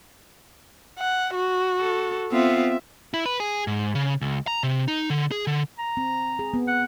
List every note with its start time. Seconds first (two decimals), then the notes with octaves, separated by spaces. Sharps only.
0.98 F#5
1.34 F#4
1.80 A4
2.32 B3 C4 F4 E5
3.14 E4
3.26 B4
3.40 G#4
3.67 G#2
3.95 C#3
4.21 C#2
4.47 A#5
4.63 C3
4.88 D#4
5.10 D3
5.31 G#4
5.47 D3
5.79 A#5
5.97 C4
6.39 G#4
6.54 B3
6.68 F#5